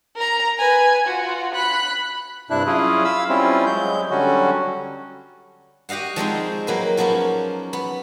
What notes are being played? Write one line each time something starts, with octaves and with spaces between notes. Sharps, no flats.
A#4 A#5
B4 G#5
F4 F#4
B5 F#6
G2 C3 D4 E4 F#6
F#3 C#4 E4 F4 G#4
F5 B5 E6
G3 C4 C#4 E4 F4
F#3 G#3 G6
D3 F#3 G3 C#4 F#4
F#4 G4 D#5 F5 F#5
F3 G#3 C4 D#4
F#3 A#3 B4
F3 F#3 A#3 B3 C#4
B3